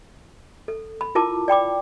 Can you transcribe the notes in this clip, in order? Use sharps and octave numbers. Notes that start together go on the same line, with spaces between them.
A4
B5
E4 F4 A#4 A5 D6
D5 G5 B5 D6